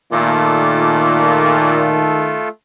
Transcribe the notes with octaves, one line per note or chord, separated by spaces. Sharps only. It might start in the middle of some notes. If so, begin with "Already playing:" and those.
A#2 D#3 A3 F4 A4 D6